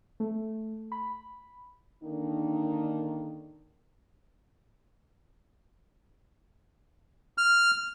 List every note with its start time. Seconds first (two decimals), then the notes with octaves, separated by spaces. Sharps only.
0.20 A3
0.92 B5
2.04 D3 D#3 A#3 D4 D#4
7.38 F6